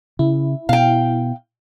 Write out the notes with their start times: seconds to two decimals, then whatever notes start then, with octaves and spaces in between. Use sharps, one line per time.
0.19 C#3 E4
0.69 B2 F5 G5